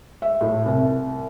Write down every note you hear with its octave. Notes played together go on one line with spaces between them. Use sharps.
E5
A2
C2